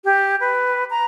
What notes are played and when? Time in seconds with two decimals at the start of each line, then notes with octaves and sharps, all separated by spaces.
0.04 G4
0.40 B4
0.90 A#5